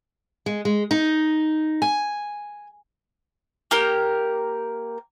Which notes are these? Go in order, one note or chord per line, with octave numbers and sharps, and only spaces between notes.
G#3
G#3
D#4
G#5
A#3 G4 A#4